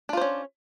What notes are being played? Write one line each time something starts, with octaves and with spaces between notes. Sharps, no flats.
C#4 D4 F4 C5